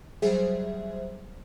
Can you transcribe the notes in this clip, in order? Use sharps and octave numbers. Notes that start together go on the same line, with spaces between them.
F#3 G3 G#4 C5 E5